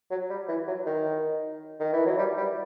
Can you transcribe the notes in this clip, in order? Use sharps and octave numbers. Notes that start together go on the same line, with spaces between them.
F#3
G3
E3
F#3
D#3
D#3
E3
F#3
G3
G3